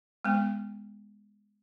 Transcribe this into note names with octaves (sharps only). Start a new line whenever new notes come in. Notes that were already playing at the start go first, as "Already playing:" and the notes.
G#3 B3